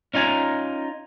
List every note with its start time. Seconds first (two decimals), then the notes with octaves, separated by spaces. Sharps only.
0.14 C#4 D#4 F4 G#5